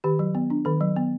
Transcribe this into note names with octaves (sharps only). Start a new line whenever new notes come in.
D#3 G4
F#3
B3
D4
D#3 A4
F#3
B3